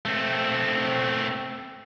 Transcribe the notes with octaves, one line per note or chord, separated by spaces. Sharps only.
A3 C4